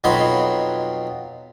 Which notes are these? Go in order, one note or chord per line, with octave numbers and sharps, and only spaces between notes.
F2 B2 F#3 D#4 B5 C6